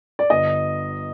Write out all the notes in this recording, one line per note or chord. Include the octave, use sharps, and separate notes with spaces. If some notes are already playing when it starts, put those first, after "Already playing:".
D5
G1 D#5